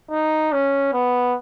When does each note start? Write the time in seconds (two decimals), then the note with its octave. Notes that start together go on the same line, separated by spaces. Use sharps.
0.11 D#4
0.52 C#4
0.93 B3